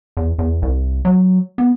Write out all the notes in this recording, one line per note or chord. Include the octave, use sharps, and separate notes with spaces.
E2
E2
C2
F#3
B3